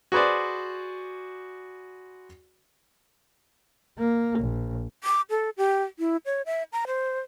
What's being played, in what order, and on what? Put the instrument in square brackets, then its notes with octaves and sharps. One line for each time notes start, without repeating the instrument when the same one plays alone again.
[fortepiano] F#4 G#4 B4 C5 D5
[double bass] A#3
A#1
[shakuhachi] D6
A4
G4
E4
C#5
E5
A#5
C5